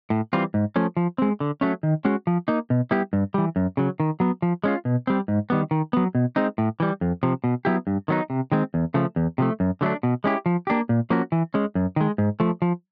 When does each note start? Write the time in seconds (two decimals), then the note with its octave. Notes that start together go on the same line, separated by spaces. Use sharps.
0.10 A2
0.33 E3 G3 C4 F4
0.54 G#2
0.76 F3 A3 C#4
0.97 F3
1.18 G#3 C4
1.40 D3
1.61 F#3 A3 C#4
1.83 D#3
2.05 G#3 C#4 F#4
2.27 F3
2.48 A#3 D#4
2.70 B2
2.91 G3 B3 E4 G4
3.13 G2
3.34 E3 G3
3.56 F#2
3.77 C#3 F#3
4.00 D#3
4.20 F#3 B3
4.42 F3
4.64 G#3 C#4 F4
4.85 B2
5.07 G3 C4
5.28 G#2
5.50 D#3 G3 B3
5.71 D#3
5.93 F#3 B3
6.15 B2
6.36 G#3 C4 D#4
6.58 A2
6.80 E3 G3
7.01 F2
7.23 C3 F3
7.44 B2
7.65 F#3 B3 E4 G4
7.87 G2
8.08 D#3 F#3 B3 D#4
8.30 C3
8.52 D#3 G#3 C4
8.74 E2
8.94 C#3 F3 A3
9.16 E2
9.38 C3 F3 A3
9.60 F#2
9.81 D3 F#3 A3 D4
10.03 B2
10.24 G#3 C#4 E4 G4
10.46 F3
10.67 A#3 D4 G4
10.89 A#2
11.10 F3 A#3 C#4 F#4
11.32 E3
11.54 G#3 C#4
11.75 F#2
11.96 D#3 G#3
12.18 G#2
12.40 F3 A3
12.62 F3